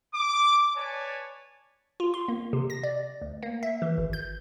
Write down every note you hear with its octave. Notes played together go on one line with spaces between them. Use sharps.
D6
B4 C#5 D5 G#5 A5
F4
C6
A#3
C3
A#6
D5
D2
A#3
E5
E3
G#1
G6